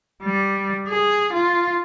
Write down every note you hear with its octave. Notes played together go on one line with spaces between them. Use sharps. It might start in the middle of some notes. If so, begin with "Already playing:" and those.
G3
G#4
F4